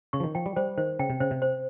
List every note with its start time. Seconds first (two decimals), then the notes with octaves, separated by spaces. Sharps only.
0.13 C#3 C#6
0.20 F3
0.24 D#3
0.35 F3 G5
0.46 G3
0.56 G3 C5
0.78 D#3 C5
0.99 C#3 G5
1.10 C3
1.20 C#3 C5
1.31 C3
1.42 C5